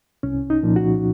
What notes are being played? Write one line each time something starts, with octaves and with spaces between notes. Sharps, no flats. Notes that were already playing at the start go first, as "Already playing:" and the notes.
C2 C#4
D#4
A#2 F3
F#4